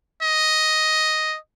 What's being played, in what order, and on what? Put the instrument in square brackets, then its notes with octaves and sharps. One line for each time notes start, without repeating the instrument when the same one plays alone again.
[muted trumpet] D#5